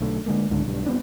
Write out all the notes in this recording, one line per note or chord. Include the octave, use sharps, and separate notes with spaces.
B1 D3 A3
D3 G#3 A#3
C#2 G#2 D3
B1 G2
G2 B3 C4 D4